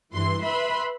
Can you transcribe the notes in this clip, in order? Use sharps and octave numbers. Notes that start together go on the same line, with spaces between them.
G2 E3 C6
B4 E5 B5 C6